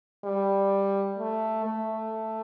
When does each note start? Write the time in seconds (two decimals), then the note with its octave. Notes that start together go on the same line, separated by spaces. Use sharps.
0.24 G3
1.18 A3
1.65 A3